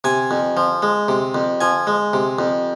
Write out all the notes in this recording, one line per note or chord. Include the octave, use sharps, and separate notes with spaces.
C3 G#5
F2
F3
G#3
C3
F2
F3 G#5
G#3
C3
F2